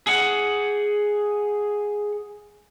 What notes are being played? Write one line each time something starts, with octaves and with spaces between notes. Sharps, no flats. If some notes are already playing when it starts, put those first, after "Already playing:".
G#4 F#5